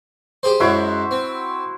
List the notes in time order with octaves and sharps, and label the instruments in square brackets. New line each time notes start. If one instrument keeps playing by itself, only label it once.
[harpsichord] G4 G#4 C5
[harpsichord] F#2 G#3 [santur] E4 F#4 C5
[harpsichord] C4